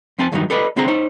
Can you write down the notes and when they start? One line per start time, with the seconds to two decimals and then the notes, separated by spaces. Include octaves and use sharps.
0.18 F2 C4 G#5 A5
0.32 E2 G2 D#3 F#3 G3 D#4
0.50 G4 A4 B4 D5 D#5
0.76 C2 D3 C4 G4 G#4 A#5
0.88 D#4 C5 C#5